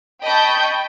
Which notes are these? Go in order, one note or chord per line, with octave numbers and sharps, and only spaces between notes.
D#5 G5 A5 B5 C#6 G6